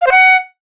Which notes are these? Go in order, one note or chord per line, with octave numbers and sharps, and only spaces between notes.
F5
C5
F#5